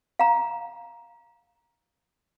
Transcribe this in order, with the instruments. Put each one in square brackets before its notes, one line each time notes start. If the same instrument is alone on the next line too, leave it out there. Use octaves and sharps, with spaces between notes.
[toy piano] F5 A#5